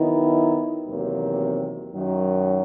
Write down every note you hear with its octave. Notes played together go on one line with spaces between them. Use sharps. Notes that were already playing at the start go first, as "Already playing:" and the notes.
Already playing: D#3 F#3 B3 E4
E2 C3 D#3 F#3 A#3
F#2 D#3 F#3